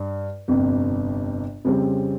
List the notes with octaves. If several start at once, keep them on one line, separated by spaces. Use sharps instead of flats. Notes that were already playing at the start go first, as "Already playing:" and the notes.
Already playing: G2
G1 F2 C3
F2 C#3 G3 C4